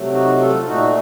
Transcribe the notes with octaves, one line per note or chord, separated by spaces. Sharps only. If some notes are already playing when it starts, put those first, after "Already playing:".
Already playing: C3 F#3 A3
D#4 F#4
F4 A4
A#2 A3 D#4 F#4